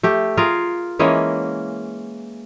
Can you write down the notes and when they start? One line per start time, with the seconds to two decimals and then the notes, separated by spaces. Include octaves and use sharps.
0.03 A3 G4
0.37 F4 G#4 A#4 F5
0.99 E3 G#3 A#3 C#4